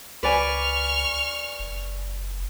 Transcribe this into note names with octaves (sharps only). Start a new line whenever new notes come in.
C#2 B4 D5 G#5 C#6 F6
F#1